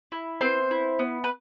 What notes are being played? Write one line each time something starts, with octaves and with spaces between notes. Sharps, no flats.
E4
B3 C4 C5
E4
B3
B4